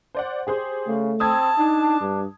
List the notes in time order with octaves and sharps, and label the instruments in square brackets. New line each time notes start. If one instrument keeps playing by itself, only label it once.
[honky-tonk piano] C5 D5 F#5
G4 G#4 C5
[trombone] C#3 [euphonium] A3
[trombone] C4 [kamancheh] A5 [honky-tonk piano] D#6 E6 G#6
[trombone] D4 [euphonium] D#4
[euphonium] G2